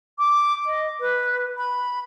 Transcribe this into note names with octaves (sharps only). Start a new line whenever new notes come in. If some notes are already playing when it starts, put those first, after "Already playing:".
D6
D#5
B4
B5